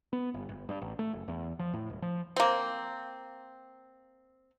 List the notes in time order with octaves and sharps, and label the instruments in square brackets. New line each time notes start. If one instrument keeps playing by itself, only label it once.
[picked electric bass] B3
G1
G1
G2
A1
A3
F#1
E2
F3
A2
D#1
F3
[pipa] A#3 C4